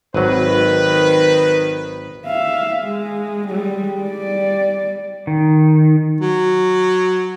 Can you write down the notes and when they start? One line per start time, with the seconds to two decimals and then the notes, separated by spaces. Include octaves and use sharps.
0.14 G#1 D#3 F#3 B4
2.26 E5 F5
2.83 G#3
3.48 G3 G#3
4.02 G3 D5
5.27 D#3
6.21 F#3